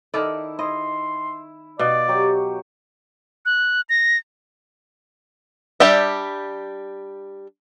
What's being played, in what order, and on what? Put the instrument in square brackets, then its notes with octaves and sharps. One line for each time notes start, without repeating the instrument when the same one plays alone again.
[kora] D#3 A4 D5 [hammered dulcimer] E4
[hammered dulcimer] E4 [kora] D#5 [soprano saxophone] C6
[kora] B2 [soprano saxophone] D5 [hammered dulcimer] F5
[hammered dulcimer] F#3 G4 C#5
[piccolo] F#6
A#6
[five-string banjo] G3 D4 G4 D5 E5